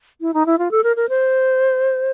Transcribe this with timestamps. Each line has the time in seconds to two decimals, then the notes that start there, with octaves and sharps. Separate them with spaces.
0.21 E4
0.34 D#4
0.46 E4
0.58 F4
0.71 A4
0.83 A#4
0.96 A#4
1.09 C5